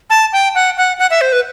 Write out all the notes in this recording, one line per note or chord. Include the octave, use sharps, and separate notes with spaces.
A5
G5
F#5
F#5
F#5
E5
C5
B4